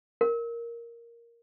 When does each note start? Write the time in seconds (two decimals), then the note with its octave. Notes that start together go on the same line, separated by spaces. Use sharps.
0.21 A#4